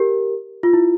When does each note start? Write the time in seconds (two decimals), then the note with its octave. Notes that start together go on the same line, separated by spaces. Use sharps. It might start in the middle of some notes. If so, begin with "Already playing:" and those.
Already playing: G4 A#4
0.63 F4
0.73 E4